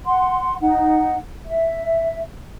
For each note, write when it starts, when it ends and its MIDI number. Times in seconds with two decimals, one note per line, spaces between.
0.04 0.55 78
0.04 0.55 84
0.60 1.18 63
0.60 1.18 78
1.44 2.20 76